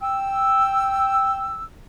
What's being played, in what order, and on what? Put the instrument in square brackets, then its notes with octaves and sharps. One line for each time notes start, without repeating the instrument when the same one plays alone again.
[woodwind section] G5 E6